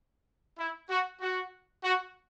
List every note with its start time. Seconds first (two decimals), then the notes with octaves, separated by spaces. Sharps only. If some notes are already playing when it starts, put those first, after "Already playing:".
0.59 E4
0.90 F#4
1.21 F#4
1.83 F#4